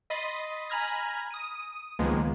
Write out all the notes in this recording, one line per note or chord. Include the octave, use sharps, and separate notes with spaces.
D#5 B5 C6 D#6 A6 B6
G#5 A#5 B5 F6 G#6 A#6
D#6 D#7
C#2 D#3 F3 G#3 A#3 B3